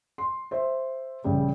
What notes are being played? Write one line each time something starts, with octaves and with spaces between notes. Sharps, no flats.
C6
C5 E5
A#1 C#3 G3